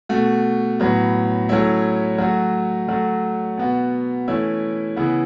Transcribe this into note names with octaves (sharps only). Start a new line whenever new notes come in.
B2 A3 F#4
A2 F#3 B3
F#3 A3 C#4 E4
F#3 A3 F#4
F#3 A3 F#4
B2 B3 F#4
E3 A3 C#4 E4
C#3 E3 B3 E4